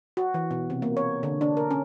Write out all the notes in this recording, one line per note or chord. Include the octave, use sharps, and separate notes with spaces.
F#4
E3
B2
C3
A#3
C#5
D3
D4
A#4
C#4